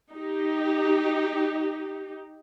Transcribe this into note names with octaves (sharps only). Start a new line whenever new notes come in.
D#4 G4